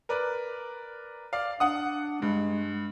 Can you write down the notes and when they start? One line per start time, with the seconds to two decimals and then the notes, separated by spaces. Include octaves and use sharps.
0.09 A#4 B4 D5
1.33 D5 F5
1.60 D4 F#5 D#6
2.22 G2 G#3